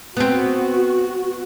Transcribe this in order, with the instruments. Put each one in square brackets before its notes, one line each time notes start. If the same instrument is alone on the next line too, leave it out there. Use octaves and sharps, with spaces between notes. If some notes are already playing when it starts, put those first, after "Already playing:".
[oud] B3 C4 [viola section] F#4